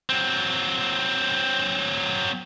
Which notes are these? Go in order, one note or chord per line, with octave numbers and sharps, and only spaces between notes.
F#3 C4